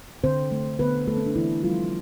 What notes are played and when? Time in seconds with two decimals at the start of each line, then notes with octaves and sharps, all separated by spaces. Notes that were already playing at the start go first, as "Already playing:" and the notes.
0.24 D3 C4 C5
0.52 A3
0.79 D3 B3 B4
1.08 A3 A4
1.17 C4
1.26 D4
1.35 D3 E3 E4
1.63 F3 G3 F4